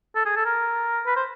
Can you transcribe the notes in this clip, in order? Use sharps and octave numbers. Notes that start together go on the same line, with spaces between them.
A4
G#4
A4
A#4
B4
C5